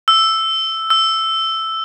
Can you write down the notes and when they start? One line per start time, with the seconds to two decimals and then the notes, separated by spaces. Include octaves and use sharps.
0.08 E6
0.90 E6